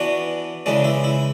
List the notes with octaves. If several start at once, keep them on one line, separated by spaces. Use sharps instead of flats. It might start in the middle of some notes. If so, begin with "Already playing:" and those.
Already playing: E3 B3 D4 F#4
C#3 E3 G#3 D4
E4
E4